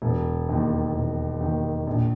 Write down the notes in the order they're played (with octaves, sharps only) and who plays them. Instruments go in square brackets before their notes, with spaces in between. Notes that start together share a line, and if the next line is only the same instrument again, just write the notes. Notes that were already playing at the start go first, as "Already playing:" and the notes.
[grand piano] E1
D#2 D#3
E1
D#2 D#3
A#1